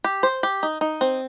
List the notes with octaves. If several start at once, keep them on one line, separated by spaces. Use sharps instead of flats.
G4
C5
G4
D#4
D#4
C4